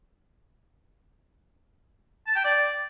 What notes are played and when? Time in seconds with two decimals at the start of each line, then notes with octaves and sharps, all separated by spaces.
2.27 A5
2.36 G5
2.45 D5